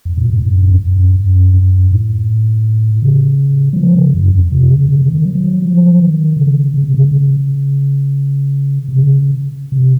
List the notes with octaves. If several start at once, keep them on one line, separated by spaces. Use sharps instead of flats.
F2
A#2
A2
F#2
F2
F#2
F#2
F#2
A2
C#3
F#3
F3
C#3
F#2
F2
C3
C#3
C#3
C#3
D#3
F#3
F3
D#3
C#3
C#3
C3
C#3
C#3
C3
C#3
C3